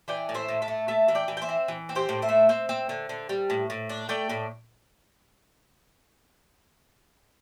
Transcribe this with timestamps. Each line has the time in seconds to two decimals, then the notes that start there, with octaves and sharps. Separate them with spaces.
0.08 E3 D5 G5
0.29 A2
0.34 C5 E5
0.48 A2
0.62 E5 A5
0.68 A3
0.88 A3 E5 A5
1.08 E3
1.15 D5 G5
1.28 E3
1.37 G5
1.42 C5 E5
1.49 C4
1.68 E3
1.89 C4
1.95 G4 C5
2.09 A2
2.22 C5 E5
2.29 A3
2.49 C4
2.69 C4
2.89 D3
3.09 D3
3.29 G3
3.50 A2
3.70 A2
3.89 D4
4.09 A3 D5 G5
4.29 A2